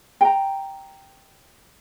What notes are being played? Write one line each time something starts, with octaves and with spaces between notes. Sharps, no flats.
G5 A#5